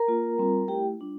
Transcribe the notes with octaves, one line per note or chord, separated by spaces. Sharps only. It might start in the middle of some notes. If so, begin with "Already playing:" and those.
Already playing: A#4 A#5
A#3 F4
G3 C4 F4
A3 E4 G4 G5
G3 D4 F4